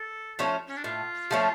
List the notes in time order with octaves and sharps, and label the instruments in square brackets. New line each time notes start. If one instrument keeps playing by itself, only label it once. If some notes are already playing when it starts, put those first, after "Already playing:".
Already playing: [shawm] A4
[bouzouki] F3 A3 C#4
[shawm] C#4
D4
[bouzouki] A2 [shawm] F4
[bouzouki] F3 A3 C#4